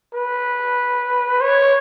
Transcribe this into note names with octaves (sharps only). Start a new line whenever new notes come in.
B4
C#5